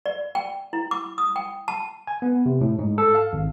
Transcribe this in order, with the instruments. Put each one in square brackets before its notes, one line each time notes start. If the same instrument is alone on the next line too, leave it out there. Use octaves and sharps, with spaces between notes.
[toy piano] D5
G5
E4
D6
D#6
G5
A5
[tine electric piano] G#5
B3
C3
A2
G#2
A4
F5
G#1